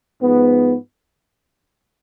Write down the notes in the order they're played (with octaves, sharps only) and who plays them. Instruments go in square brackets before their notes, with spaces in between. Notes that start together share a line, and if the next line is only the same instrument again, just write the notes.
[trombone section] G#2 F3 B3